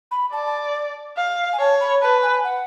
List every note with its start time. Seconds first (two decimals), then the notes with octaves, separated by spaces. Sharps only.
0.11 B5
0.32 D5 A5
0.46 A5
1.17 F5
1.53 G#5
1.59 C#5 A5
1.80 B5
2.02 B4 A5
2.23 G#5
2.44 F#5